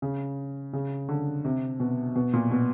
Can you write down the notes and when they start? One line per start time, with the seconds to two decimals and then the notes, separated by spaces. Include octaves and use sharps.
0.02 C#3
0.73 C#3
1.09 D3
1.45 C3
1.80 B2
2.16 B2
2.33 A#2
2.51 B2